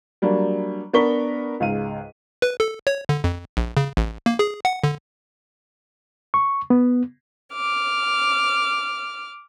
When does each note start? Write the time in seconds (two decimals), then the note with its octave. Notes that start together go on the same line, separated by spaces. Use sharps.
0.22 F#3 G3 A#3 D4
0.94 B3 D4 A#4 C#6 B6 G7
1.60 C#2 G#2 F5 D#7
2.42 B4
2.60 A4
2.87 C#5
3.09 D3
3.24 F2
3.57 A#1
3.77 C#3
3.97 A1
4.26 A#3
4.39 G#4
4.65 F#5
4.84 D3
6.34 C#6
6.70 B3
7.53 D6 F6